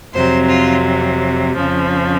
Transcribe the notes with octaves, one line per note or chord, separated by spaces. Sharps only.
F2 C3 F#3 C5
F4
F2 C#3 F3